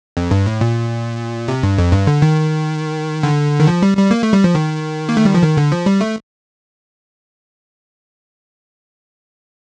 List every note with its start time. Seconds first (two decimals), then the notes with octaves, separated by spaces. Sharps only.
0.17 F2
0.31 G2
0.46 A2
0.61 A#2
1.48 C3
1.63 G2
1.78 F2
1.92 G2
2.07 D3
2.22 D#3
3.23 D3
3.60 D#3
3.67 F3
3.82 G3
3.97 G3
4.11 A#3
4.23 A3
4.33 G3
4.44 F3
4.55 D#3
5.09 A#3
5.17 A3
5.25 G3
5.35 F3
5.42 D#3
5.57 D3
5.72 F3
5.86 G3
6.01 A3